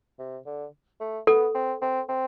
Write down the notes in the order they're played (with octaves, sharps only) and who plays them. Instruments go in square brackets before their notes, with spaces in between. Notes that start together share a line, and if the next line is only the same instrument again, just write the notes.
[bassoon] C3
D3
A3
[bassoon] B3 [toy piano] A4
[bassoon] C4
C4
C4